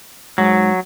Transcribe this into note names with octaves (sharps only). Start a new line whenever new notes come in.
G#2 F#3